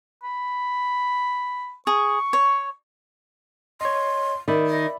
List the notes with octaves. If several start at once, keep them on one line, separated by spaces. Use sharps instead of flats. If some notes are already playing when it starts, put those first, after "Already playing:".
B5
G#4 C#6
C#5
C#5 D#5 C6
D#3 D5 E5 B5
D#5